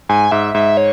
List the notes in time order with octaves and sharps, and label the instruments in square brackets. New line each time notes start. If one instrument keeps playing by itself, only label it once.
[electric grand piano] G#2 [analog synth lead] G#5
[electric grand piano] G#2 [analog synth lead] E5
[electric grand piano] G#2 [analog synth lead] E5
[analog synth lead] C#5